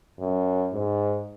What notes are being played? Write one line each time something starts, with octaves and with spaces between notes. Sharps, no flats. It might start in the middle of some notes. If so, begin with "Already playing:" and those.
F#2
G#2